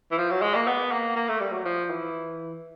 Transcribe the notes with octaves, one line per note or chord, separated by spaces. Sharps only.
E3
F3
F#3
G#3
A#3
B3
A#3
A#3
A3
G3
F#3
F3
E3